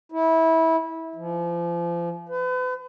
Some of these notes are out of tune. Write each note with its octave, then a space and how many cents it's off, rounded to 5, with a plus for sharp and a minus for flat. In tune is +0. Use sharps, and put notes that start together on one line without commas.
E4 -20
F3 -35
B4 +40